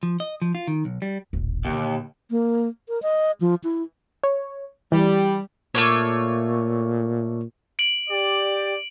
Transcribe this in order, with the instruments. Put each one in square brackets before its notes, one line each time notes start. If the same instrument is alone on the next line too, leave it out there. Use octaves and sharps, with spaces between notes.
[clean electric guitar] F3
D#5
F3
F4
D#3
B1
G3
[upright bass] D#1 A1
[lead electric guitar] D#2 [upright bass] A#2 D3
[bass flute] A#3
A#4
D#5
F3
E4
[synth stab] C#5
[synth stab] E3 [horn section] G3
[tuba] A#2 [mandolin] A3 A#3 C#5
[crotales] D7 F#7
[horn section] G4 D5